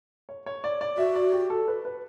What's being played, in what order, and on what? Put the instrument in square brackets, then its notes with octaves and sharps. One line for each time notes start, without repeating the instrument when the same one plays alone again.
[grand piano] C#5
C#5
D5
D5
[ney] F#4 [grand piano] E5
[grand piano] D5
G4
A4
B4
B4